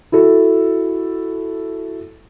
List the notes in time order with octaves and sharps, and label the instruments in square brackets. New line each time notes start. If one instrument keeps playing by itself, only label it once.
[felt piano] E4 F#4 A4